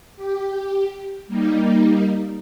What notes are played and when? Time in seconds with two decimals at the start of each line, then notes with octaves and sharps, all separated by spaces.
0.16 G4
1.27 G3 A#3 D#4